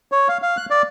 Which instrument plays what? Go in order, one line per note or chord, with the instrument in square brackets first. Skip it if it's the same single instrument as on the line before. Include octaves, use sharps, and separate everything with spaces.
[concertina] C#5
F5
F5
F#6
D5